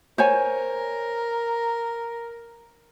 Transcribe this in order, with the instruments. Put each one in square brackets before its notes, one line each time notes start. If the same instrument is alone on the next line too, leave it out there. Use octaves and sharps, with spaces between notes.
[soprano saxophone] A#4 [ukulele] C5 C#5 G#5